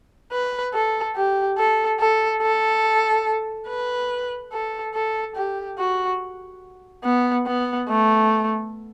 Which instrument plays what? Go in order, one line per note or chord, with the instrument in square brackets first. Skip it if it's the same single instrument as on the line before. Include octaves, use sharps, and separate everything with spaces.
[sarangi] B4
A4
G4
A4
A4
A4
B4
A4
A4
G4
F#4
B3
B3
A3